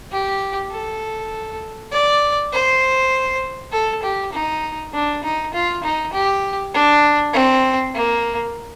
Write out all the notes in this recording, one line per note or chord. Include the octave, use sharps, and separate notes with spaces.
G4
A4
D5
C5
A4
G4
D#4
D4
D#4
F4
D#4
G4
D4
C4
A#3